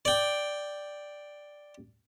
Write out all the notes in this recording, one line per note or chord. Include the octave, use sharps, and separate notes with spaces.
D5 G5